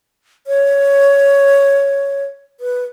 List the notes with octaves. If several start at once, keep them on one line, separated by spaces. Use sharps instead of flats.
C#5
B4